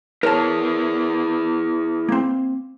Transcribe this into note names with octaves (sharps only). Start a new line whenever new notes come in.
E4 G#4 A#4 B4 C#5 A5
A#3 C4